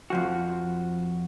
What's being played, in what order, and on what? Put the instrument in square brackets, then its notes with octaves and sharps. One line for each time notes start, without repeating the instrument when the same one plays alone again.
[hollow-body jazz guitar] F2 F3 F#4